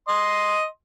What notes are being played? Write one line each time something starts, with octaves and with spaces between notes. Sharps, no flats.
D#5 C6